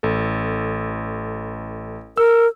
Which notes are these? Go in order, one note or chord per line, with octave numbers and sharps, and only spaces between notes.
A1 A4
A#4 E6